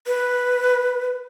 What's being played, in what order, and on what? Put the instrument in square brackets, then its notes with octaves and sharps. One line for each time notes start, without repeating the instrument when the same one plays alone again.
[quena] B4